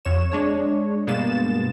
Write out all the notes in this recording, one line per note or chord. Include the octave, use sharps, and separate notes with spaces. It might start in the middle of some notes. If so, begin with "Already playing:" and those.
F2 C#5 E7
G#3 D4 C#5
G2 B2 G#3 A#3 A6 E7